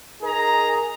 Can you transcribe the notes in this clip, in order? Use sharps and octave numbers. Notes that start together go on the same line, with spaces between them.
D#4 G#4 A#4 A#5